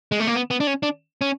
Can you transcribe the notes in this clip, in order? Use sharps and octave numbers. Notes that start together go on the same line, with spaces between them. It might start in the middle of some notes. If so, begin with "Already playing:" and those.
G#3
A3
A#3
B3
B3
D4
C#4
D4
C#4